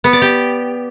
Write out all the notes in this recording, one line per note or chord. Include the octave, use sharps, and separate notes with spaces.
B3
D5
G4